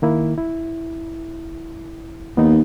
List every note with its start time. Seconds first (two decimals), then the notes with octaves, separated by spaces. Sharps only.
0.02 D#3 A#3 E4
0.38 E4
2.37 D#2 B3 D#4